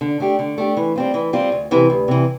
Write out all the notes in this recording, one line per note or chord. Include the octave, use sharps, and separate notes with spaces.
D3
A3 D4 G4
D3
A3 D4 G4
E3
G3 C4 F4
E3
G3 C4 F4
D2
C3 E3
D2
C3 E3